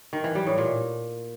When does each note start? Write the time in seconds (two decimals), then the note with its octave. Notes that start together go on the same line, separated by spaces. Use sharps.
0.13 D#3
0.24 E3
0.35 G3
0.47 A2
0.58 A#2